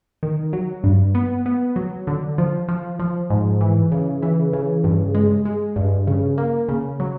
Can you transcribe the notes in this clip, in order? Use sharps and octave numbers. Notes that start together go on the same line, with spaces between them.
D#3
F#3
G2
B3
B3
F#3
D3
F3
F3
F3
G#2
E3
C#3
E3
C#3
G2
G#3
G#3
G2
C#3
A#3
C#3
F#3